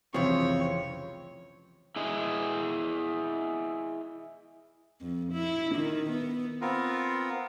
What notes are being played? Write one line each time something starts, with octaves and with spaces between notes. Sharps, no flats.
F1 C2 C#3 E3 F3 C4 C#5
E4 G#4 D#5
F2
E4
D#3
B3
B3 C4 F4 A#4